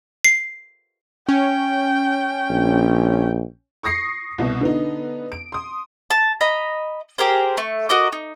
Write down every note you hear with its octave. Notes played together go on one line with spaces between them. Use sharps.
C7
C#4 G5
A#1
C#6 D#6 A#6 C7 C#7
C2 B2
D3 B3 D#4
D7
C6 D#6
A5
D#5 A#5 B5
G4 G#4 A#4 C5
A3 C#6
F#4 A#4 D#5 D6
D#4